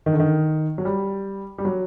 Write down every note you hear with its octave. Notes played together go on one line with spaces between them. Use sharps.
D#3
D3
D#3
F#3
G3
G3
F#3